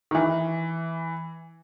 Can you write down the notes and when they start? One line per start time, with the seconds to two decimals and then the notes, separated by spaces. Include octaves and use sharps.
0.11 D#3
0.15 E3